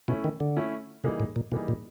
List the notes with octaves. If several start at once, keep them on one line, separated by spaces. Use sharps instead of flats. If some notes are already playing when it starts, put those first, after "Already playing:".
B2 A3 C#4 E4
D#3
D3
A3 C#4 E4
C3 E3 G3 A#3 D#4 G#4
A2
A#2
B2 E3 G3 A#3 D#4 G#4
A#2